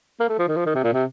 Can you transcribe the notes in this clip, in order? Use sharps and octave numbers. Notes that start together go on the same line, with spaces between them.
A#3
A3
F3
D#3
F3
D#3
C3
A#2
C3